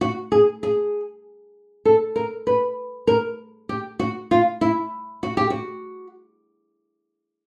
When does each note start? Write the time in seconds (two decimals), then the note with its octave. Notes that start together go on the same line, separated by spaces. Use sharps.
0.01 F#4
0.32 G#4
0.63 G#4
1.85 A4
2.16 A#4
2.47 B4
3.07 A#4
3.69 G4
3.99 F#4
4.31 F4
4.61 E4
5.23 F#4
5.37 G4
5.50 F#4